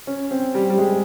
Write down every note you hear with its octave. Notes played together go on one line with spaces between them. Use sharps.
C#4
C4
G3
G3
G#3